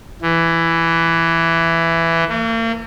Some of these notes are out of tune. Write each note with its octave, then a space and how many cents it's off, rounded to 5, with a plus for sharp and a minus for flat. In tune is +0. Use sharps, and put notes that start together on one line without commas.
E3 +10
A#3 -40